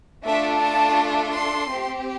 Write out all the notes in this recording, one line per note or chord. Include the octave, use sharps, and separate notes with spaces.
A3 D4 F4 A4 E5
A5
C6
C4 G4